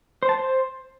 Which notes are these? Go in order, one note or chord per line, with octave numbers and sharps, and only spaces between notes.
C5
A5
C5